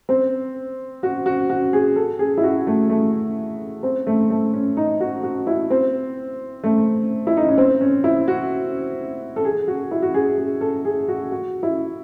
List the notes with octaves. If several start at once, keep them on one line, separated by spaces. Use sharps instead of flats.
C4
F#4
F#4
F#4
G#4
A4
G#4
E4
F#4
A3
A3
C4
A3
A3
C#4
D#4
F#4
F#4
E4
C4
A3
E4
D#4
C#4
C4
C#4
E4
F#4
A4
G#4
F#4
E4
F#4
G#4
G#4
A4
G#4
F#4
F#4
E4